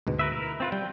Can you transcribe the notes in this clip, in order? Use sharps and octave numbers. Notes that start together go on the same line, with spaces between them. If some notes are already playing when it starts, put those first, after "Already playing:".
D2 G#2 B2
A#4 B4 E5
E4 A#4
C4 F4 B4
G3 G5